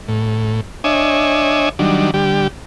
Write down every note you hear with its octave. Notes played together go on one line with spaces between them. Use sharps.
A2
D4 C#5 D#5 E5 G#5
D#3 F#3 G3 D4
D3 G3 G4